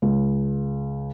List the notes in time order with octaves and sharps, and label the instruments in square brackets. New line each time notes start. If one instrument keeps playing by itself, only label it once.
[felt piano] C#2